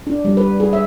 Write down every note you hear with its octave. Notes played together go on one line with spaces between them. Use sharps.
D4
G3
B4
G#4
E5